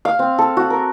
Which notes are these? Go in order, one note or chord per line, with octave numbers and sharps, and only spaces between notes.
F5
C4
A4
F#4
A#4